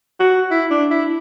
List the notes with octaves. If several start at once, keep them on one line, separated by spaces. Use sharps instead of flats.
F#4
E4
D4
E4